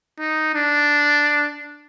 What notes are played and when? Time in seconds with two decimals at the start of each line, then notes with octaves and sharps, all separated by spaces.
0.19 D#4
0.54 D4